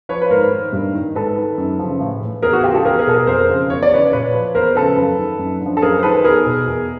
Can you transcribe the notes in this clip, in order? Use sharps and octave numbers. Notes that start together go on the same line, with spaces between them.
F3 B4 C#5
B4
G#2 A#4 C5
D#3
G2
D#3
G#2 A4 B4
D#3
F#2
C#3 F3
A2
E3
E2 G#4 A#4
F#4 G#4
C#3 F3 F4 G4
G4 A4
E2 G#4 A#4
G#4 A#4
B2 A4
G#4 A#4
F2 A#4 C5
C#3 F3
E2 C#5
D5
C#3 E3 B4 C#5
A#2 B4 C#5
F3
E2 A#4 C5
C#3 F3 A4 B4
F#2
D#3
F#2
D3
F3
A4
F#2 G#4 A#4
C5
D#3 A4 B4
E2 G#4 A#4
B2
E2